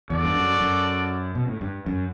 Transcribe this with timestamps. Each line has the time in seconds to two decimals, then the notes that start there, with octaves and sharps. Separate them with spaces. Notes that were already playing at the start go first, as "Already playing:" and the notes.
0.10 E2 F#4 A4 D5
0.24 G2
0.35 F#2
0.60 F#2
1.35 B2
1.48 A2
1.61 G2
1.86 F#2